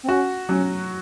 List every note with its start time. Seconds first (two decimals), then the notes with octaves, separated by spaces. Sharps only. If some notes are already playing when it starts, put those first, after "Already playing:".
0.03 C4
0.08 C#4 F#4
0.49 F#3 C#4